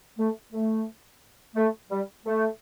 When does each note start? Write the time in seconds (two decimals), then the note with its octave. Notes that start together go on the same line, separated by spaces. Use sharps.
0.18 A3
0.52 A3
1.56 A3
1.90 G3
2.25 A3